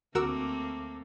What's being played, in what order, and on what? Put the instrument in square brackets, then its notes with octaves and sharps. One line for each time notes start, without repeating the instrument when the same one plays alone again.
[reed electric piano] D2 D6 [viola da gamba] A3 A#3 C4 [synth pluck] F#4 A#4 E6